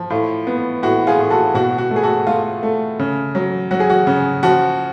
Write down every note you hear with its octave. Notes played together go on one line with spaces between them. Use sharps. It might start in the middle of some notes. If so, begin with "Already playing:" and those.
Already playing: F3
A2 F4
B3
A2 F#4
F4 G#4
A2
F#4 A4
B2 F#4
F#4
A3
G#4
F#4 A4
A3 F4
A3
C#3
F#3
F#3 F#4
G#4
F#4
C#3
F3 F#4